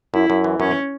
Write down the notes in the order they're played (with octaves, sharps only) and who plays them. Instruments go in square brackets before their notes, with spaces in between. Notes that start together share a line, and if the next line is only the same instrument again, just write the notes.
[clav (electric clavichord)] F#2 [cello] E4
[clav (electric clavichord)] F#2
E3
[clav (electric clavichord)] F#2 [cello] C#4